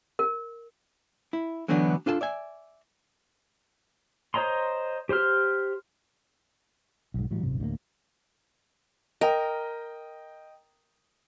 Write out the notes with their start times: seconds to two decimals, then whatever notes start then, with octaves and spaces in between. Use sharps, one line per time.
0.19 A#4
1.33 E4
1.68 D3 E3 F#3 A3 B3 D4
2.06 D4 F4 A4 G#5 A5
2.21 D5 E5 G#5
4.34 C5 C#5 D#5 A#5 C6
5.09 G4 C5 C6 F6
7.14 B1 G#2
7.31 A2 E3 F#3 G3
7.43 D#1 G#1 F#2 C3
7.60 D2 A2 G3 A#3
9.21 A#4 D#5 G5